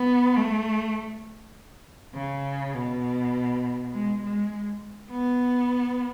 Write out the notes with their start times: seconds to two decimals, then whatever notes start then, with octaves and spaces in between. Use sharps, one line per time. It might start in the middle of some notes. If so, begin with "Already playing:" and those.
Already playing: B3
0.36 A3
2.14 C#3
2.74 B2
3.92 G#3
4.22 G#3
5.10 B3